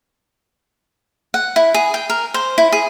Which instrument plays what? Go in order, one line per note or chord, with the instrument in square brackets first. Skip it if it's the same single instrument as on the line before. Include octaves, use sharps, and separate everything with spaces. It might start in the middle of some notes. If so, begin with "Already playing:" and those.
[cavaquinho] F#5
E4
G#4
G5
A#4
C5
E4
G#4